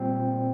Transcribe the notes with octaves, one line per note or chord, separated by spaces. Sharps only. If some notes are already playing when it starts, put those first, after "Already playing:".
Already playing: A#2 G3 C4